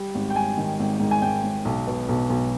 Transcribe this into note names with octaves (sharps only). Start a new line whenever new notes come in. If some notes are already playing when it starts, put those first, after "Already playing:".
Already playing: G3
G#1
G5
G3 G#5
D#3
G#1
G#2
G#5
G#1 G5
G#2
B1
B2
B1
B1